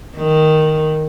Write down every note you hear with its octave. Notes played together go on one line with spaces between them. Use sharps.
D#3